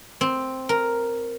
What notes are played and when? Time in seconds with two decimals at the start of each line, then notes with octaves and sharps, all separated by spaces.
0.21 C4
0.69 A#4